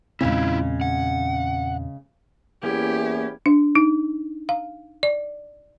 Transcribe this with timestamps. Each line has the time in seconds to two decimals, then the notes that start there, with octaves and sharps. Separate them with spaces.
0.21 E2 A#2 C#3 G#3 C4 E4 F4
0.81 F#5
2.63 E2 A#3 C#4 E4 G4
3.46 D4
3.75 D#4
4.49 F5
5.03 D5